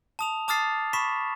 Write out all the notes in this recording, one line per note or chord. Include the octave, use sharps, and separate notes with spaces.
A5 D#6 F7
A5 D6 D#6 F6 A6 C7
B5 C#6 B6 E7